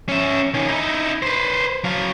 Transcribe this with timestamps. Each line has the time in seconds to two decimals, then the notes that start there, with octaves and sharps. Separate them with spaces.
0.09 C#4 E5
0.54 D#3 C#4
0.68 D#4 E4
1.22 B4 C5
1.84 F#3 F5